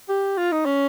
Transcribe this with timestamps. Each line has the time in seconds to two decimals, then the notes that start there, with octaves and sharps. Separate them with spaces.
0.09 G4
0.37 F4
0.52 D#4
0.65 C#4